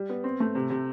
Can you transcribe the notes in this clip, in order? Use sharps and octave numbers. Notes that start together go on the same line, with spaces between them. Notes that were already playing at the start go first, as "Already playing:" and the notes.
Already playing: G3
B3
C4
A3
C3
C3